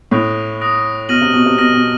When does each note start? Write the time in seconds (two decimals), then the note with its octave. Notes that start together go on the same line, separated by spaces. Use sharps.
0.11 A2 D#6 F#6 A#6 D7 F7
0.60 D#6 F#6 A#6 D7 F7
1.09 B2 F6 A#6 D#7 F#7
1.21 C3
1.33 B2
1.46 C3
1.58 B2 F6 A#6 D#7 F#7
1.74 B2